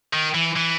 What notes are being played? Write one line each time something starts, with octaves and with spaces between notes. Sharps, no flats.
D#3
E3
E3